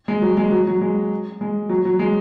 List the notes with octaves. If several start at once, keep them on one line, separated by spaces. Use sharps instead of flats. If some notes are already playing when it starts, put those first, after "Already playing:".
G#3
F#3
G#3
F#3
F#3
G#3
G#3
F#3
F#3
G#3